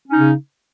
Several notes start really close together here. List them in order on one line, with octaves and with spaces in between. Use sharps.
C#4 D#4 C#3